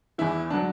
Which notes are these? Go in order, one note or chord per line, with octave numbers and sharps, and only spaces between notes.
E2 E3 E4
D3 F#3 D4